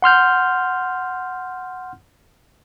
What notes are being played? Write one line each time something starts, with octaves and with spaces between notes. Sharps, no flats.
F#5 C6 F6 G6